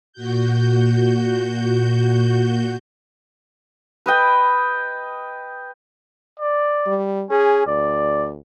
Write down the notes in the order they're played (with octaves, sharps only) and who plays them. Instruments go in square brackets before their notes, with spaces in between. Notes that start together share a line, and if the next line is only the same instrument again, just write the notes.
[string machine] A#2 F#4 G6
[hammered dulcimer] B4 D#5 G5
[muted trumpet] D5
[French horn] G3
[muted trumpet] C#4 [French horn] G#4
[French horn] D2 [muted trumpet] D5